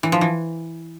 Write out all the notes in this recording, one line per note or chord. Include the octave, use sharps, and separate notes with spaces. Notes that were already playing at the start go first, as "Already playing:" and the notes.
E3
F3
E3